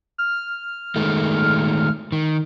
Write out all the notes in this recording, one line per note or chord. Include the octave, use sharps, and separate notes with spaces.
F6
D#3 G#3 A3
D#3